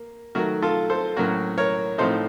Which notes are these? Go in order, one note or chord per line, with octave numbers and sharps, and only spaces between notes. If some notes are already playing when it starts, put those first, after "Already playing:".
Already playing: A#3
D#3 F#3 A3 F#4 A#4
F4 A4
A4 C5
A2 F#3 A#3 C#4 F#4 A#4
A#4 C#5
A2 F3 C4 D#4 A4 C5